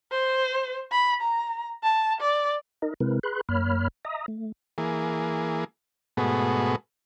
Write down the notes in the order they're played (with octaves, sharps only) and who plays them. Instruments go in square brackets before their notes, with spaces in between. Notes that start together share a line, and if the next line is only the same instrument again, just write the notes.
[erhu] C5
B5
A#5
A5
D5
[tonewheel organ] D#4 A#4 D#5
C3 G#3 C4 E4 A#4 B4
G#4 B4 B5 C6 F#6
F#2 A#3 C#5 B5 F6
D#5 E5 A#5 D#6
A3
[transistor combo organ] E3 A#3 G#4
G#2 B2 A3 B3 F#4 G#4